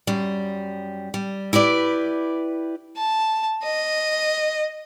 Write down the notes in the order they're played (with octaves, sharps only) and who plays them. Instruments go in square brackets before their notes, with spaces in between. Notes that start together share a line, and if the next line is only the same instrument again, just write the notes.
[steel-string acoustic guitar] F#2 G3
G3
E4 G4 B4 D5
[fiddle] A5
D#5